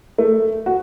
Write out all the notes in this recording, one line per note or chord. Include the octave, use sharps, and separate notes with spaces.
A3
F#4